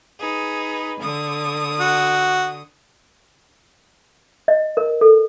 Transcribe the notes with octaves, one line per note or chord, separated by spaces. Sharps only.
D#4 G#4 B4
D3 D#6
F#4
D#5
A#4
A4